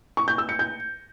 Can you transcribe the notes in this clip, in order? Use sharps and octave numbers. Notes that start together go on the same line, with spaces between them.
C#6
G6
E6
C#7
G6